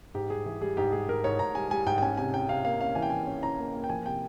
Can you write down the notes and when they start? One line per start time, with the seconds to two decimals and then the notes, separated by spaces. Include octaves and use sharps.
0.14 G#2 G4
0.30 G3 G#4
0.46 E3 G#4
0.61 G3 G#4
0.77 G#2 G4
0.92 G3 G#4
1.08 G#2 A#4
1.24 G#2 C#5
1.39 G#2 A#5
1.55 G3 G#5
1.71 G3 G#5
1.86 G#2 G5
1.98 G5
2.02 C#4 G#5
2.17 C3 G#5
2.33 C#4 G5
2.49 C3 F5
2.65 A#3 F5
2.81 C#4 F5
2.95 E3 G#5
3.02 G5
3.10 E3 G#5
3.27 C#4
3.43 C#4 A#5
3.59 A#3
3.74 A#3
3.84 G5
3.89 F3 G#5
4.06 C3 G5